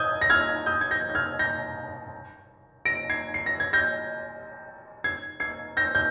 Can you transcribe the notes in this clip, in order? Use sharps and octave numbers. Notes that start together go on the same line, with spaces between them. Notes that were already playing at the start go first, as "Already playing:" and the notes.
Already playing: D#6 G6 G#6
A#6
F6 G#6
D#6 G6
G#6
G6 A#6
G6
F6 G#6
G6 A#6
A#6 D7
G#6 C7
C7
A#6
G#6
G6 A#6
G#6 C7
G#6 C7
G6 A#6
G6